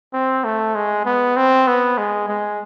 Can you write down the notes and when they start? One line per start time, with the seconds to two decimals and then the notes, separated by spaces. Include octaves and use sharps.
0.13 C4
0.44 A3
0.75 G#3
1.06 B3
1.37 C4
1.67 B3
1.98 G#3
2.29 G#3